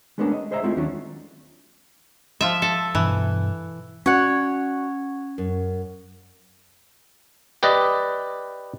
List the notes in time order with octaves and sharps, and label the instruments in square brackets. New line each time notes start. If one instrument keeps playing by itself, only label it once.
[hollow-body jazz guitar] G#3 A3 B3 C#4 D4 A#4
D#5
G#4 C5 D#5 E5 A#5
G#3 A3 C4 E4 F4
D#2 D#3 F#3 C#4 D4
[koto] F3 F4 E5
A4
[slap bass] G2 B2 [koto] E3
[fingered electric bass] C#4 [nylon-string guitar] F#4 D5 [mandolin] C#5 F#5
[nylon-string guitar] F#2
[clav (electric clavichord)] G4 B4 D5 D#5